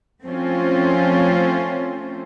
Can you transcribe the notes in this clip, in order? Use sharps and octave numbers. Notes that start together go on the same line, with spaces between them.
F3 A3 C4 C#4 F4 C5